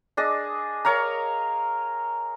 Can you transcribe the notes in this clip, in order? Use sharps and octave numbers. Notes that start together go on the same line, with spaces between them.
D4 G#4 D#5
A#4 C#5 F5 A#5